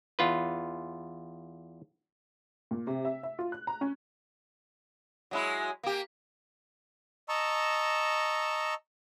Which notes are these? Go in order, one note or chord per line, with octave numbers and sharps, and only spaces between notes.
E2 F4 B4
A#2
C3
E5
E5
F4
F#6
A#5
C#4
F#3 G#3 E4
A#3 G4
D#5 A5 A#5 C#6 E6